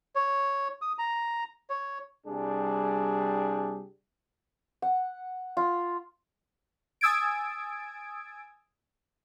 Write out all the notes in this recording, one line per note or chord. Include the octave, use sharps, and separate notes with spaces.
C#5
D#6
A#5
C#5
C2 G3 D4 G#4
F#5
F4
G#5 D#6 E6 G#6 A6 D7